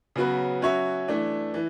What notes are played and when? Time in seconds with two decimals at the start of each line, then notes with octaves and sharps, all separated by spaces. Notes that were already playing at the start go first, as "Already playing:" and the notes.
0.16 C#3 F#3 B3 F#4 B4
0.62 F#3 C#4 F#4 C#5 E5
1.08 E3 A3 D4
1.54 E3